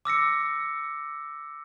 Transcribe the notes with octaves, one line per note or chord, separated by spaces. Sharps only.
D6 E6 A#6 C#7